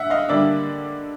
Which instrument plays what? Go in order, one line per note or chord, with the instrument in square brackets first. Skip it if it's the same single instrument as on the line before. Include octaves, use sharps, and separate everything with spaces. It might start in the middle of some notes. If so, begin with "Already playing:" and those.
Already playing: [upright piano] E5 F#5
D#5 F5
D3 G3 A#3 D4 D5 E5